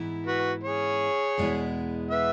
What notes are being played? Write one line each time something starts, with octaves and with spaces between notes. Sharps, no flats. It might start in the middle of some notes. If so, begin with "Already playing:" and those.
Already playing: G#2 E3 B3 E4
F#4 B4
G#4 C#5
E2 B2 G#3 B3 E4
B4 E5